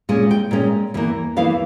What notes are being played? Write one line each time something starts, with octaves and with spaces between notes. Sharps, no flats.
A#2 G#3 C#4 G#5
G5
A#2 G#3 C#4
E2 E3 A#3
E2 E3 A#3 F5